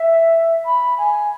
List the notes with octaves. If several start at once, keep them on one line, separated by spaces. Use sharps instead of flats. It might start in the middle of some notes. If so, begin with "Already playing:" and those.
Already playing: E5
B5
G#5